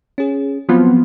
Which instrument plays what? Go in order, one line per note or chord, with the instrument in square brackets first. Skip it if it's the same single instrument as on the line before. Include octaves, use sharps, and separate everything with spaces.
[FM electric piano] C#4 G#4
[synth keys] F3 B3 F4 [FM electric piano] F#3 C4